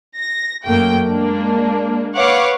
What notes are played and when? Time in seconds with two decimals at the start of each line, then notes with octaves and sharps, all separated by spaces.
0.16 A#6
0.66 F#2 A3 A#3 G5
1.07 G#3 A#3 D4
2.16 B4 C#5 F5 F#5 C#6 D6